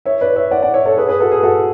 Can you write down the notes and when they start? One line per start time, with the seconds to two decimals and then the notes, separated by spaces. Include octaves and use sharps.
0.05 C#5 E5
0.21 B4 D5
0.36 C#5 E5
0.51 D5 F#5
0.62 D5 F#5
0.74 C#5 E5
0.86 A4 C#5
0.97 G#4 B4
1.08 G#4 B4
1.20 F#4 A4
1.32 G#4 B4
1.43 F#4 A4